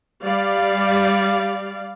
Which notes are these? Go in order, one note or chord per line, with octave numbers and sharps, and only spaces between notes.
G3 D5 F5